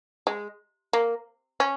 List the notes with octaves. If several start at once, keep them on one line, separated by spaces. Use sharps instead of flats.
G#3
A#3
C#4